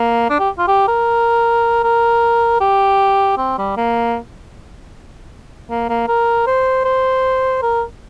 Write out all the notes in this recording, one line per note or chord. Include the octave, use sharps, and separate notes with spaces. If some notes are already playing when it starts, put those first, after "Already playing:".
Already playing: A#3
D4
G4
F4
G4
A#4
A#4
G4
C4
G3
A#3
A#3
A#3
A#4
C5
C5
A#4